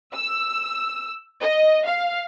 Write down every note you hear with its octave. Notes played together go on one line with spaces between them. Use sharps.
E6
D#5
F5